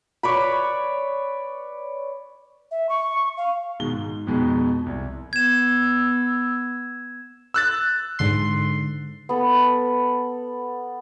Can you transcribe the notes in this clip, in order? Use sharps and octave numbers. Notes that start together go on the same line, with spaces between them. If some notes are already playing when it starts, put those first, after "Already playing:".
B4 C#5 D5 B5
E5
C#6
F5
B2 D#3 G#3 G7
G#2
F2 B2 G#3 B3 D#4
C2
B3 E6 G#6 E7
E6 F#6 A6
G#2 D3 C6
B3 A4